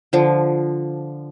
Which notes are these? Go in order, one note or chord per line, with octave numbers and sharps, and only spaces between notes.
D3 F3